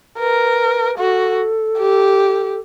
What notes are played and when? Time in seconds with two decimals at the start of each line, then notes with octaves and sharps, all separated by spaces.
0.19 A#4 B4
0.98 F#4 A4
1.78 G4